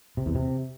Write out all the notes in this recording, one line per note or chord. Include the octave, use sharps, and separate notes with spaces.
C3
E2
C3